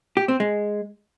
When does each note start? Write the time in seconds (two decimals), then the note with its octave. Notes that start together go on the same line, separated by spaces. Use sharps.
0.17 G4
0.28 C4
0.40 G#3